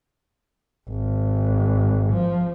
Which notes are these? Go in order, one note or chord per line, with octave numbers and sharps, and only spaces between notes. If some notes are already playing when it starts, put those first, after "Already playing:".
G#1
F3